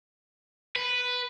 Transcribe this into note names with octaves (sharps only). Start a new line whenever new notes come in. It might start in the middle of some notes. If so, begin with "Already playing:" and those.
B4